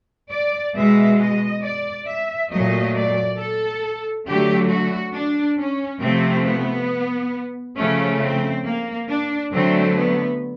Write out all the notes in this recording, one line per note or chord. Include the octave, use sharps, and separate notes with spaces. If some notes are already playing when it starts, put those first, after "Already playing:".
D5
B2 G#3 E5
D#5
D5
E5
A#2 F#3 A3 D#5
D5
A4
D3 F#3 A3 G4
F#4
D4
C#4
C3 F3 A3 C4
B3
C#3 F3 A3 C#4
C4
A#3
D4
D3 F#3 A3 C4
B3